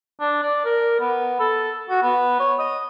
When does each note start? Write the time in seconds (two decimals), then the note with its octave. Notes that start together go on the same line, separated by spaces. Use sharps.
0.20 D4
0.43 D5
0.65 A#4
1.00 B3
1.39 A4
1.89 F#4
2.03 B3
2.40 C#5
2.59 D#5